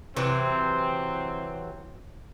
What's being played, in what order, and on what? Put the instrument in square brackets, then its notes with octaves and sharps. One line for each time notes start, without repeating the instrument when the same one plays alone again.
[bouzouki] C3 E3 F#3 [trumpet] C4